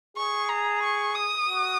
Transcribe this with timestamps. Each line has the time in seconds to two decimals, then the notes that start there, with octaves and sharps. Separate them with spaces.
0.16 G#4 C#6
0.49 A#5
0.83 C#6
1.15 D#6
1.48 F#4